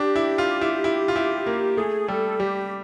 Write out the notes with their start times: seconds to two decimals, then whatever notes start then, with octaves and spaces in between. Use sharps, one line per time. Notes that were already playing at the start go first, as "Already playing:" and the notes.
Already playing: D4 G4
0.16 E4
0.38 F4
0.61 E4
0.84 E4
1.08 F4
1.16 E4
1.46 A#3
1.77 A3 G#4
2.08 G3 A4
2.40 G3 G4